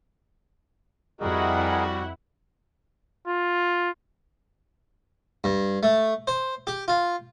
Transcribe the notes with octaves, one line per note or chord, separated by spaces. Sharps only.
F2 G3 E4 F#4 G#4 A#4 D#5 F#5
F4
G2
A3
C5
G4
F4